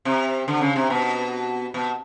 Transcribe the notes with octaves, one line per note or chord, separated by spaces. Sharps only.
C3
D3
C#3
C3
B2
B2